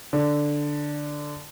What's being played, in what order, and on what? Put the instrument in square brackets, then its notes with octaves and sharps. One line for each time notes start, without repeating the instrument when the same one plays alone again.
[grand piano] D3